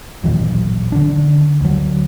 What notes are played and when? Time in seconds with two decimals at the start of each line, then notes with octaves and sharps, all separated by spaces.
0.24 D#1 A1 D#2 F#3
0.92 D3 D4
1.61 D2 F#3